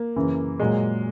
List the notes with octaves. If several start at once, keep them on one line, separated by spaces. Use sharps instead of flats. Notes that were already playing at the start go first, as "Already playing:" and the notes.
Already playing: A#3
F#2 C#3 E3
A#2 F#3 G#3